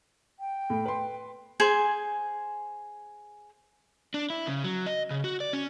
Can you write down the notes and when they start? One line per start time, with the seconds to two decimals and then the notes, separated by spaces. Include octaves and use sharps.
0.40 G5
0.70 A2
0.86 B4 C6
1.60 G#4 C5 G#5
4.14 D4
4.30 E4
4.47 C#3
4.64 F#3
4.86 D#5
5.11 C#3
5.24 F#4
5.40 D5
5.53 C#4